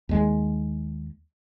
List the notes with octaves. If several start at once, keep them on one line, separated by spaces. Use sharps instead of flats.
D#2 G#3